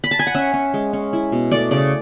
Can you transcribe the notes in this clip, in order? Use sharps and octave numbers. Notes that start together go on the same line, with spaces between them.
B5
A5
G#5
F#5
C#4 E5
C#4
G#3
C#4
E4
B2
A3 D5
C#3 D5